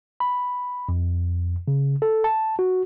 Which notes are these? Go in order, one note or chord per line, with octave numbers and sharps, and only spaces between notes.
B5
F2
C#3
A4
A5
F#4